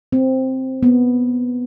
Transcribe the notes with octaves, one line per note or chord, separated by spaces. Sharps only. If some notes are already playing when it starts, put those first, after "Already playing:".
C4
B3